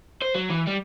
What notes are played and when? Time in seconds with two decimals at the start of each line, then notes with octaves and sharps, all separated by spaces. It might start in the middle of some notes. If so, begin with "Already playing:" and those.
0.22 C5
0.35 F#3
0.50 E3
0.67 G3